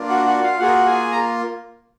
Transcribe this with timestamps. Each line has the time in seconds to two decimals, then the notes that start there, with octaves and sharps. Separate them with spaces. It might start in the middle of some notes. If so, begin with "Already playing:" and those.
Already playing: A#3 D4 F4
0.09 F#4 F#5
0.26 F#4 F#5
0.43 F4 F5
0.60 A#3 F4 F#4 G#4 F#5
0.85 G#4 G#5
1.12 A#5